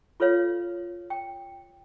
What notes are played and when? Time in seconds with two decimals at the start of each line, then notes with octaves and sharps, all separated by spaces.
0.20 F4 A4 B4 C#5 F5
1.10 G5